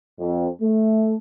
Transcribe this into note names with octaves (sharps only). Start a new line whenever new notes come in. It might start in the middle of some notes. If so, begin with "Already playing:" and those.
F2
A3